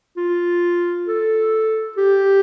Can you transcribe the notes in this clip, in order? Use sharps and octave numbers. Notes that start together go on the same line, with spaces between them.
F4
A4
G4